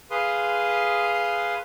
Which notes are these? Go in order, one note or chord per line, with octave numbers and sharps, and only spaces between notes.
G#4 B4 F5 C6 D#6